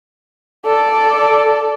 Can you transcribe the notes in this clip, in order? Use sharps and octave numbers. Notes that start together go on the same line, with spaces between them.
A4 D5